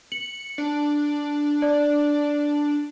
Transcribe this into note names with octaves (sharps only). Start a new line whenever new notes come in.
C#7 F#7
D4
D5